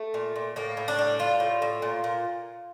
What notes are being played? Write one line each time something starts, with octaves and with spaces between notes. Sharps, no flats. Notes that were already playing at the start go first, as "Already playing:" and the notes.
Already playing: A3
A#2
A#2
A2 A#3
A2
D4
G3
G3 F4
A2
A2
A#2
A#2